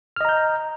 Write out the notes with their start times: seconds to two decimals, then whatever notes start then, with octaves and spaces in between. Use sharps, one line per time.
0.16 F6
0.21 D#5
0.25 A#5
0.29 G6